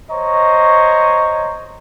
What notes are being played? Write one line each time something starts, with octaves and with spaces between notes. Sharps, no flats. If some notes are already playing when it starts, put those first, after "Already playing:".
C5 C#5 D#5 A#5 C#6